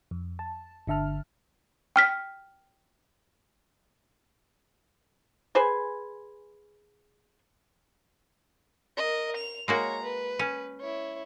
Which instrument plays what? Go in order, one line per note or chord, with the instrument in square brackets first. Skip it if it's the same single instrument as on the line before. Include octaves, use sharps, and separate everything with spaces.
[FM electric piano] F2
A5
G1 D3 E5 A5 F6
[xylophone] G5 F6 B6
[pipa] G#4 B4 C5 G#5
[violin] A#4 D#5
F7
[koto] G#3 A#3 F#4 [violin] C#5 A#5
[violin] B4
[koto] C#4
[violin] E4 C#5